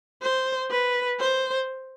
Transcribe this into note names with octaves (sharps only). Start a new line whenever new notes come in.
C5
B4
C5